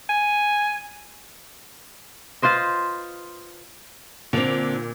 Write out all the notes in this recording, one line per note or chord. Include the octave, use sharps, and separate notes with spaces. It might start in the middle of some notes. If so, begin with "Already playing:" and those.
G#5
F4 B4 C5 D#5
A#2 D3 C4 F7